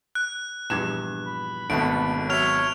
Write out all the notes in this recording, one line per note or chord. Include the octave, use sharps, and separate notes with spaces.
F#6
A#1 E2 G2 G#6 E7
B5
G#1 B2 D3 A3 B3 A5 D7
F#3 C#5 E5 F6 F7